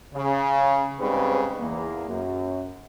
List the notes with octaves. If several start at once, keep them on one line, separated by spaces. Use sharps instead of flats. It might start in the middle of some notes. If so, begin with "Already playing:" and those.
C#3
G#2 C#3 G3 C4 B4
E2 A#3
F#2